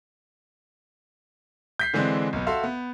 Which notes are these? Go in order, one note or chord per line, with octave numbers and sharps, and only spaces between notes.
G6 B6 C7
D3 E3 G#3 C4 D4
B1 B3
F#4 A4 E5 F5 C6
B3